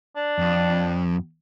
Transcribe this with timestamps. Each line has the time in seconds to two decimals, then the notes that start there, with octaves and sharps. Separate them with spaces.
0.16 D4
0.39 F2